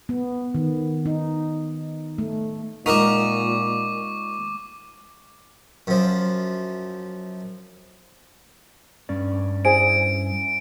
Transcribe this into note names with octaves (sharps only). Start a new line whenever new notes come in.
B3
D#3
D#4
A3
A#2 G#3 D#4 A#4 D#5 F#5 C#6 D6
F#2 F3
G2 C#4 D5
E4 G#4 C5 G#5 D7